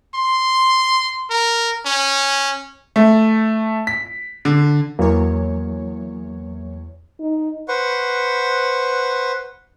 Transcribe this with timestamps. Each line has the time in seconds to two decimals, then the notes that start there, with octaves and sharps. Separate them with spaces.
0.14 C6
1.30 A#4
1.86 C#4
2.96 A3
3.87 B6
4.45 D3
4.99 E2 E3 F#3 A#3 C#5
7.20 D#4
7.68 B4 C5 F#5 C#6